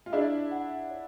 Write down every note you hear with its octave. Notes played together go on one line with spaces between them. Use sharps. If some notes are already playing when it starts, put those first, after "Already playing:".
F4
D4 E4 G#4
F#5
C#5